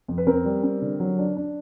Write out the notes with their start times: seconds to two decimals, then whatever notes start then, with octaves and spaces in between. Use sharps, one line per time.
0.08 F2
0.18 B4
0.27 C4 A#4
0.45 G3
0.63 C4
0.82 D3
1.00 F#3
1.19 D4
1.36 D4